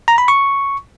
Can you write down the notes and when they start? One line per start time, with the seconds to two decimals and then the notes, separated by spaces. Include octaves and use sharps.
0.08 A#5
0.18 B5
0.28 C#6